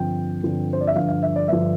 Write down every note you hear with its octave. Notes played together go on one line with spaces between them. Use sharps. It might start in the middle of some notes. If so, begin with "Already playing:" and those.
Already playing: G2 D3 F3 C4 G5
G2 D3 F3 C4
C5
D5
E5
G2 D3 F3 F5
F5
E5
D5
G2 D3 F3 E5